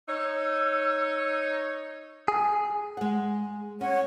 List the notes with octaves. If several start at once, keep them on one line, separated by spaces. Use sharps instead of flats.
D#4 C#5 E6
G#4
G#3 F#5
C#4 C#5 F#5